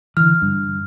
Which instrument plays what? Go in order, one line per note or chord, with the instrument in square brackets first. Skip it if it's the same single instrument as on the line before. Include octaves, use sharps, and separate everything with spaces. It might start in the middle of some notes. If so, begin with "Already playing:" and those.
[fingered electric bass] D3 E3 [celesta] F6
[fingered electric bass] G2